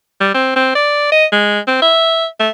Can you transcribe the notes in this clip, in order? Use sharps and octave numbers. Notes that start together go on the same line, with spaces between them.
G3
C4
C4
D5
D#5
G#3
C4
E5
A3